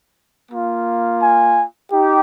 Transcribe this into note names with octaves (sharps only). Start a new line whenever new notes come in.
A#3 F4
G#5
D#4 G4